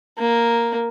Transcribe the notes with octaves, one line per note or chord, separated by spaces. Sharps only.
A#3